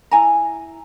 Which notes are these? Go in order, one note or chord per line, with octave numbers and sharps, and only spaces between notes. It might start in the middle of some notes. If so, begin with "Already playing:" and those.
E4 G#5 A#5